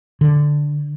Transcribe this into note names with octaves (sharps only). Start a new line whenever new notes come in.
D3